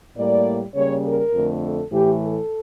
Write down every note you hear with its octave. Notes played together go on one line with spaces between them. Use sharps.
A2 G3 A#3 D5
C#3 G3 A#3 C#5
A#4
F2 D3 A3
A4
A2 E3 A3 G4
A4